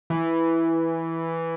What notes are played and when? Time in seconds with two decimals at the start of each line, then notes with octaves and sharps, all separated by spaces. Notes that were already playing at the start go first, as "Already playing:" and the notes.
0.10 E3